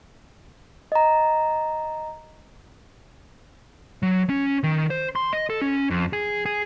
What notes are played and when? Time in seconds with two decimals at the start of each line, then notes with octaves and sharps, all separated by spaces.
0.92 D#5 A#5
4.03 F#3
4.30 C#4
4.63 D#3
4.90 C5
5.16 C6
5.33 D#5
5.50 A4
5.61 C#4
5.90 F2
6.13 G#4
6.46 G#4